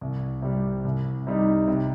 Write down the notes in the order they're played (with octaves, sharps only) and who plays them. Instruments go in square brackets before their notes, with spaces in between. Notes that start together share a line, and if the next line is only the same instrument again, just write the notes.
[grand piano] C2
C3 G3
C2
C3 G3 D#4
C3